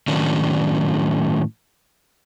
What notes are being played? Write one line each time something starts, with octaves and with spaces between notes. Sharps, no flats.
A2 D#3 F#3 C#4 D4